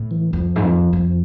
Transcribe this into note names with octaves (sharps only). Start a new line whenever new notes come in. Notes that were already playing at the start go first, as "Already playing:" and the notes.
Already playing: A2
E3
F2 F3
G#2
F2
F2